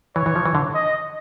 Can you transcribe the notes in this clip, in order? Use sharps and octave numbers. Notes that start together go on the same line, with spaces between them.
E3 C#5
E3
F3
E3
D3
D#5